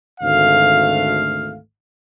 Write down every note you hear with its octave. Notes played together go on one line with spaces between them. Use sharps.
G#1 D2 A3 F5